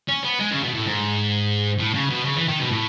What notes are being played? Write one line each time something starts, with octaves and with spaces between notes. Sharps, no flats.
C#4
B3
G#3
C#3
B2
A2
G#2
A2
C#3
B2
C#3
E3
D#3
B2
A2